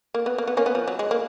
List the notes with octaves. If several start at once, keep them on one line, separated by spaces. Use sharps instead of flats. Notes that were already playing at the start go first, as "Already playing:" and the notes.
A#3
B3
A#3
B3
A#3 C#4
B3
F3
F#3
G#3
A#3